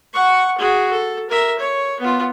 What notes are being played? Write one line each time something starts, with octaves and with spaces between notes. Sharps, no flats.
F#5 C#6
F#4 G#4
A4
A#4 E5
C#5
B3 F4